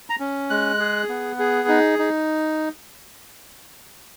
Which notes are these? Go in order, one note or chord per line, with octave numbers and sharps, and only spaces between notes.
A#5
C#4
G#3 F#6
G#4
B3
G#4
D#4
D#4